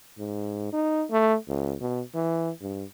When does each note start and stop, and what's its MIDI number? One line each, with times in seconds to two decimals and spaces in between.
0.19 0.72 44
0.73 1.04 63
1.11 1.35 57
1.48 1.75 37
1.81 2.01 47
2.15 2.50 52
2.61 2.84 43